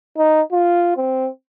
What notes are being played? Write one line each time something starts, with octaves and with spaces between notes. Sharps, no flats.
D#4
F4
C4